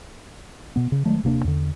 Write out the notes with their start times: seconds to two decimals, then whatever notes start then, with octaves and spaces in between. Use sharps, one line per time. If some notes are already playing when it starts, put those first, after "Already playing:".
0.76 B2 B3
0.92 C#3
1.05 D#3 F#3 G#3 A3
1.23 D#1 C3 A#3 D4
1.45 E2 D3